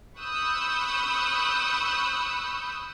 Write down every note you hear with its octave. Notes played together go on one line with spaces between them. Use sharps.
B5 C#6 D#6 E6 F#6 G6